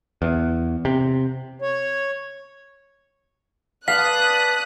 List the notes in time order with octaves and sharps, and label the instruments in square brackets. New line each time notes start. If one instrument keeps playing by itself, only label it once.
[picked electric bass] E2
C3
[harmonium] C#5
[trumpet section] B4 D5 A5 [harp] F5 [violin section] D#6 F#6 [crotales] B6